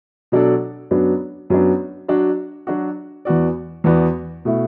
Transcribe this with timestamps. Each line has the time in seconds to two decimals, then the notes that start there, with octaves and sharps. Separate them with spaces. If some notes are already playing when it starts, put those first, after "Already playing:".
0.32 B2 F#3 D4 A4 D5
0.91 F#2 F#3 B3 D4
1.50 F#2 F#3 B3 D4
2.08 F#3 D4 F#4
2.67 F#3 D4 F#4
3.25 E2 E3 B3 F#4 D5
3.84 E2 E3 B3 F#4 D5
4.45 B2 A3 E4